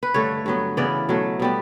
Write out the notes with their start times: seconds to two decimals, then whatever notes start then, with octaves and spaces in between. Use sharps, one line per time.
0.03 B4
0.14 G2 D3 A3 C#5
0.46 G2 F#3 B3
0.77 C#3 E3 B3 D5
1.09 B2 F#3 A3
1.40 B2 G3 B3